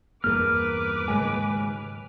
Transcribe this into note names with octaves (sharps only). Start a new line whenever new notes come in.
E2 G2 A#3 G#4 A#4 B4 D6 F6
D#2 G#2 C#3 F#3 G#3 G#5